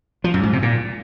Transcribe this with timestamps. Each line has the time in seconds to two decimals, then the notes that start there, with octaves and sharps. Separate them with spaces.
0.24 F3
0.34 F#2
0.43 G#2
0.53 C3
0.63 A#2